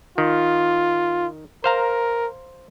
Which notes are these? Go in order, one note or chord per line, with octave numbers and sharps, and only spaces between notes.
D#3 F4
A#4 C5 F5 A#5